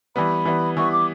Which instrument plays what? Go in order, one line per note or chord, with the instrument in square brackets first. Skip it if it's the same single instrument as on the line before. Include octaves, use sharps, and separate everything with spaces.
[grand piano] E3 G3 B3 [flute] B5
[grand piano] E3 G3 B3
[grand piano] E3 G3 B3 [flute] C#6
[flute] D6